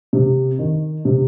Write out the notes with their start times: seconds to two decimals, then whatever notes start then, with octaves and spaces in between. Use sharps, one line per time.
0.13 C3
0.59 D#3
1.05 C3